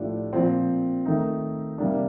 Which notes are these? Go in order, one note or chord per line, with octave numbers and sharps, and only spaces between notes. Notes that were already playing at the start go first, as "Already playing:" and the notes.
Already playing: A2 F3 A3 D4 G4
A#2 F3 C4
D#3 A3 D#4
C3 G3 A#3 D4